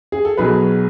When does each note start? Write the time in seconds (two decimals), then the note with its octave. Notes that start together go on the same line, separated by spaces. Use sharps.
0.12 G#4
0.25 A4
0.37 B1 B2 F#3 G#4 B4